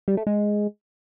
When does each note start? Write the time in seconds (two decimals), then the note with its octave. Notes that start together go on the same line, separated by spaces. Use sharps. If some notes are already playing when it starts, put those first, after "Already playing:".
0.08 G3
0.17 A3
0.27 G#3